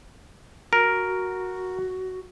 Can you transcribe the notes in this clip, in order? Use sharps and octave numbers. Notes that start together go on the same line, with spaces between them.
F#4 A#4